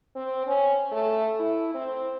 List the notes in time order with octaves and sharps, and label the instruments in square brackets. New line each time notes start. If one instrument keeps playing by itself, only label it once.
[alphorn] C4
C#4
A3
E4
C4